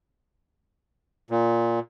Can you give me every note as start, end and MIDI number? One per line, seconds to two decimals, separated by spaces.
1.30 1.80 46